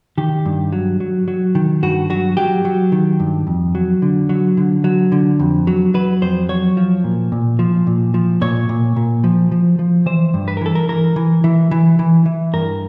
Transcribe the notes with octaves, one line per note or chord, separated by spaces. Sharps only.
D#3 G4
G2
F#3
F#3
F#3
D#3
G2 F#4
F#3 F#4
F#3 G4
F#3
D#3
G2
F2
F#3
D3
F#3
D3
F#3
D3
F2
F#3
F#3 B4
F2 C5
F#3 C#5
F3
A#2
A#2
F3
A#2
F3
A#2 C#5
A#2
A#2
F3
F3
F3
E3 C5
G2
B4
A#4
E3 A4
A#4
E3 A#4
E3
E3
E3
E3
E3
G2 A#4